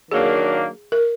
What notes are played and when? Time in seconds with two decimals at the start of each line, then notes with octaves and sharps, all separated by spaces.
0.11 D#3 F#3 A#3 D4 G#4
0.92 A#4